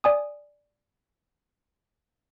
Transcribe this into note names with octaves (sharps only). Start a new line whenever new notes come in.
D5 G#5 D#6